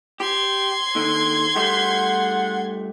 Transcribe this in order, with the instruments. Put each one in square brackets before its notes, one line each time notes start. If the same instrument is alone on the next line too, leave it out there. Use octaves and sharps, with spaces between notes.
[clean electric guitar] G4 [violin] C6 G#6
[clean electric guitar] D#2 D3 D#3
[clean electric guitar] G2 A3 G4 [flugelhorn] F#5